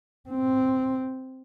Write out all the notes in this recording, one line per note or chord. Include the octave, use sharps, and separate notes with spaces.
C4